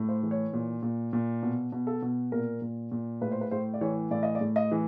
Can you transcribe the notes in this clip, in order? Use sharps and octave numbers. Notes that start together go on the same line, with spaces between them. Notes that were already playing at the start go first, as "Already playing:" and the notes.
Already playing: A2
C5
E3
C#5
A#2
A#2
A#2
B2
B2
A4
B2
A#2 A#4
A#2
A#2
A2 B4
C5
B4
A2 C5
D5
E3 C#5
A2 D5
D#5
D5
A2
D#5
E3